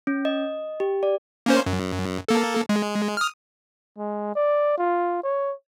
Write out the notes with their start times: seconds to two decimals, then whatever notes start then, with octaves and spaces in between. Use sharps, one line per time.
0.07 C#4
0.25 D#5
0.80 G4
1.03 D5
1.46 A#3 C#4 C5
1.66 F#2
2.28 A#3 A4
2.69 G#3
3.17 D#6 F6
3.98 G#3
4.35 D5
4.78 F4
5.23 C#5